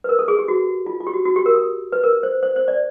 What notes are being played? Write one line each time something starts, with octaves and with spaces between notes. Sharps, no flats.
B4
A#4
A4
G#4
G4
F#4
F4
F4
G4
F#4
F#4
G4
A#4
A4
B4
A#4
C5
C5
C5
D5